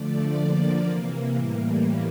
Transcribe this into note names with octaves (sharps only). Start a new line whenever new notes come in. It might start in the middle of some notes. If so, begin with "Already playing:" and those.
Already playing: D3 F3 A3 D5
D3 F3 A#3
C3 E3 A#3
A2 E3 G3 A#3